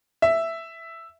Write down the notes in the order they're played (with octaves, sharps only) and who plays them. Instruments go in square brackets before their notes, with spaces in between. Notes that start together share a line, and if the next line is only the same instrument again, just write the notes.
[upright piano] E5